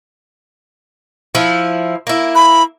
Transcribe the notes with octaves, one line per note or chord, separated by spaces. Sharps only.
F3 E4
A#3 E4
B5